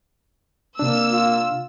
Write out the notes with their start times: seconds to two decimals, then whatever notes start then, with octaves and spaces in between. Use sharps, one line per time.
0.79 C3 A#3 D4 E6
1.12 F4